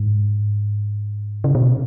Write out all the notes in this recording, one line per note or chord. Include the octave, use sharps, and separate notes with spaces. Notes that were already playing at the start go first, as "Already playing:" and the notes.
Already playing: G#2
C#3
B2